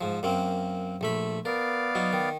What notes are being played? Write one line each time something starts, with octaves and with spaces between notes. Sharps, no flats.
G#2 F3
F#2 A#3 C4
A#1 A3 B5
B3 A#4 D5 F5
F#3 D#4
D#3